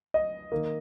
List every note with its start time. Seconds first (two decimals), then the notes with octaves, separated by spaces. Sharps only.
0.14 D#5
0.52 D#3 A#3